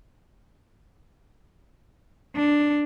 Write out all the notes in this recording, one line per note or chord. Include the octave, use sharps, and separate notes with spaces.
D4